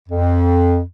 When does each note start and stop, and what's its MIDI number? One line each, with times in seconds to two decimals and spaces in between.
0.09 0.81 41